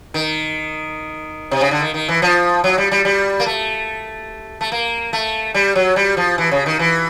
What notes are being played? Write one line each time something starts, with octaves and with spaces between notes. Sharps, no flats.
D#3
C3
C#3
D3
D#3
D#3
E3
F3
F#3
G3
G3
G3
A#3
A3
A3
A#3
A3
G3
F#3
G3
F3
E3
C#3
D#3
E3